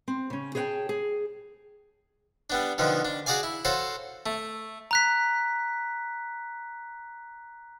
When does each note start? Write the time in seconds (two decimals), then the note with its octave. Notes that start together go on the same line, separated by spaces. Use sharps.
0.08 C4
0.30 C#3 C#4
0.55 G#4 C#5 D#5 F#5 G5 A5
0.89 G#4
2.50 G3 B3 D4
2.78 B2 D3 D#3 F3 B3
3.05 D4
3.26 F#4 G#4 D5 F5 G#5
3.43 E4
3.65 F#4 A4 C5 C#5 F5
4.26 A3
4.91 A#5 F#6 B6